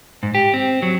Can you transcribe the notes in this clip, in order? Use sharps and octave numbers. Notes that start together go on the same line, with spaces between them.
G#2
G4
C4
F#3